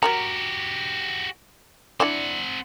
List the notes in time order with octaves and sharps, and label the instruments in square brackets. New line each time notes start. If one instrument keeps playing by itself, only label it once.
[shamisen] F#3 A#4 A#5 [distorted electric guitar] F#4 G4
[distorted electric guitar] C4 F#5 [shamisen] D4 E4 D5